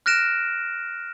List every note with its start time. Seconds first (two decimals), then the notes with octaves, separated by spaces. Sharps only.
0.06 F6 F#6 A#6 D7 E7